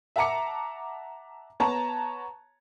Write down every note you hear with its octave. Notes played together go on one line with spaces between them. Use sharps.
E5 F#5 A5 A#5 D6 C#7
B3 C#5 A5 A#5